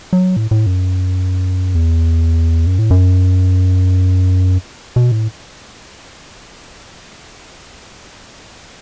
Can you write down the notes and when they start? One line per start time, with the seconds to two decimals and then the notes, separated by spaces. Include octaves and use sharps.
0.13 F#3
0.37 A2
0.51 A2
0.66 F#2
1.75 E2
2.66 F#2
2.79 A2
2.91 F#2
4.96 B2
5.12 A2